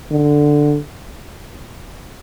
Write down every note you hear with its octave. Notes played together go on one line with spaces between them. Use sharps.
D3